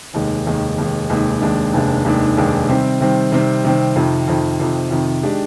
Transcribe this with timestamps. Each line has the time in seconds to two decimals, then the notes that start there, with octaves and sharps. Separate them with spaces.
0.14 F1 D#2 D#3 G#3 D#4
0.46 F1 D#2 D#3 G#3 D#4
0.78 F1 D#2 D#3 G#3 D#4
1.10 F1 D#2 D#3 G#3 D#4
1.42 F1 D#2 D#3 G#3 D4
1.74 F1 D#2 D#3 G#3 D4
2.05 F1 D#2 D#3 G#3 D4
2.37 F1 D#2 D#3 G#3 D4
2.69 C3 D#3 G3 C4
3.00 C3 D#3 G3 C4
3.32 C3 D#3 G3 C4
3.64 C3 D#3 G3 C4
3.96 F2 C3 D#3
4.28 F2 C3 D#3
4.60 F2 C3 D#3
4.91 F2 C3 D#3
5.23 D#3 G#3 D4 G4